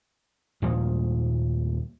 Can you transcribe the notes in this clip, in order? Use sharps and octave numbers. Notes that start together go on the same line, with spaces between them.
D#2 A#2 F3 G#3